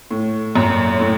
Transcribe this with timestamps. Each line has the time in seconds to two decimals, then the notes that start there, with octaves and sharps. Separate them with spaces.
0.11 A2
0.55 F#2 A#2
1.00 A2